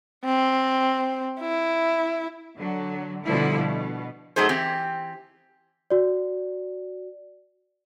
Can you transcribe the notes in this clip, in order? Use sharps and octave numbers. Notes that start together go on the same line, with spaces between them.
C4
E4
D3 F#3
B2 D3 F3 G3 E4
B2
F#3 A3 D#4 G#4 C5
E3 C4 G4
F#4 D5